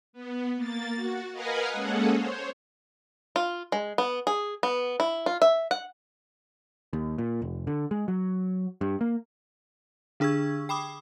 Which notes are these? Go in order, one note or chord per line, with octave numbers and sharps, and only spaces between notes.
B3
A#3 A6
F#4
A#4 B4 D#5 F5 F#5 G#5
G#3 A#3 C#4 G#4 A4 F#5
C5 C#5
F4
G#3
B3
G#4
B3
E4
F4
E5
F#5
D#2
A#2
F1
D3
G#3
F#3
G2
A#3
D3 D4 G#4 C#6 E6 G#6
G5 B5 D6 D#6